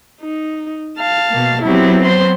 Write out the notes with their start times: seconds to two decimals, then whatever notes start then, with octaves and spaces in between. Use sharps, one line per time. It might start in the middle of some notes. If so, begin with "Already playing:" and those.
0.21 D#4
0.98 F5 A5
1.30 B2 A#3
1.63 F#3 B3 C4 E4 G4
2.02 C5 C6